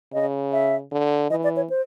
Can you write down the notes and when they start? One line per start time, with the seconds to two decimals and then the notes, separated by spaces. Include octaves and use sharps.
0.13 C#3 D#5
0.52 E5
0.92 D3
1.30 E3 D#5
1.44 D5
1.56 C#5
1.70 C5